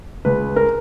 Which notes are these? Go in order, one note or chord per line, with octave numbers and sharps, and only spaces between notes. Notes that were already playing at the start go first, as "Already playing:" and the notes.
C#2 B4
A#4